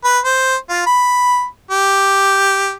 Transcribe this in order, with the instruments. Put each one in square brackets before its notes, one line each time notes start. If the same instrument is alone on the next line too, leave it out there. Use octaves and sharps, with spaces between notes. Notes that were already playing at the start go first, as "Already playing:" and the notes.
[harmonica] B4
C5
F4
B5
G4